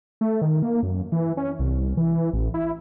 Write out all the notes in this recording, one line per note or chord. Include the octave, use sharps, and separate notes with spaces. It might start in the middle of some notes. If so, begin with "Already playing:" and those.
A3
D#3
A#3
F#2
E3
C#4
C2
E3
A1
E4